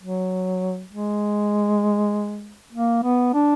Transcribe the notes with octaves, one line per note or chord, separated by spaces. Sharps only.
F#3
G#3
A#3
B3
D4